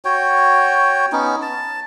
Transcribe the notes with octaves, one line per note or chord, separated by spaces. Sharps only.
F#4 C#5 G5
B3 C#4 D#4
A5